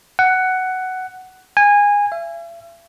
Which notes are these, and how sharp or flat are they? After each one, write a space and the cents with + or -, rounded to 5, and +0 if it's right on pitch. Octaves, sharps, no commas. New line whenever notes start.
F#5 +10
G#5 -20
E5 +45